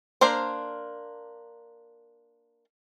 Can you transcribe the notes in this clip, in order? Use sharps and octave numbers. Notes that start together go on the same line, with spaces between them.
A#3 D4 A#4 C5